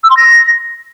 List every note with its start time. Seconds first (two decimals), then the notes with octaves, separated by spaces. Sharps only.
0.04 E6
0.10 C6
0.17 A#6